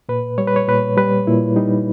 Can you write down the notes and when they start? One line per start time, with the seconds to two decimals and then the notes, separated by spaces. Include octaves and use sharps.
0.09 A#2 B4
0.38 G3 C#5
0.47 B4
0.56 C#5
0.68 A#2 B4
0.97 G3 B4
1.27 A#2 E4
1.56 G3 D#4